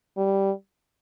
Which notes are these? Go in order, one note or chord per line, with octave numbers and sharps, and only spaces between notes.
G3